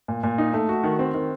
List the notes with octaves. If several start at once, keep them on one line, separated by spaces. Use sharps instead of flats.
A#2
A#2
D#4
A3
F#4
D#3
C4
D#3